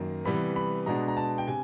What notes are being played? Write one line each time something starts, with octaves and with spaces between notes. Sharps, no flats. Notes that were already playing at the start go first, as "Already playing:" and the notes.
Already playing: F#2 D#3 A#3
C3 E3 G3 B3 B5
B5
B2 G#3 B3 D4 A#5
A#5
A5
G5
C3 G#5